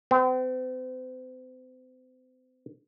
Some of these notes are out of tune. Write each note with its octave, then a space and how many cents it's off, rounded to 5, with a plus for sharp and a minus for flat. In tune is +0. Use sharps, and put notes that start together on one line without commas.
C4 -40